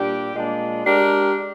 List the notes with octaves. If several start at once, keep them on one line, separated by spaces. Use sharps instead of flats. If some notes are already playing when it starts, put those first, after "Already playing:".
Already playing: A#2 G3 D4 G4
A#2 G#3 D4
G#3 D4 G4 A#4